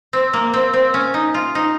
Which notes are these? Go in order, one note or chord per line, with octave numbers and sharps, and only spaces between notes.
C4
A#3
C4
C4
C#4
D#4
F4
D#4